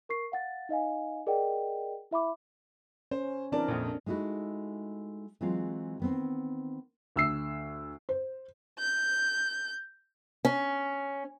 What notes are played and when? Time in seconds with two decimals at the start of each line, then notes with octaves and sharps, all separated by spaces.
0.09 A#4 C#6 C7
0.32 F5 F#5 A6
0.69 D#4 D#5 F5 G#5
1.27 G#4 A#4 D5 D#5 F#5 G5
2.11 E4 E5 B5 D6
3.11 C#4 C5
3.52 E3 C4 D4 A#4 D5 A5
3.68 A#1 F2
4.06 G#3 A3 D#4 E4 F#4
5.41 E3 F#3 G#3 C4 F4
6.00 D#3 B3 C4
7.16 D2 E6 C7
8.09 C5
8.79 G6
10.45 C#4